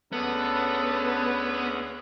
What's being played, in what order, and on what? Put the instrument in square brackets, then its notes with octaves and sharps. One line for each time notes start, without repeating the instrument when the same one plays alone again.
[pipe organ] D2 G#4 F#5 [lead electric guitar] B3 [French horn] C#4 [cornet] A4